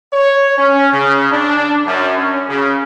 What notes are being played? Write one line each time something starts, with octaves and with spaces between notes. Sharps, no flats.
C#5
C#4
C#3
D4
F#2
C#4
C#3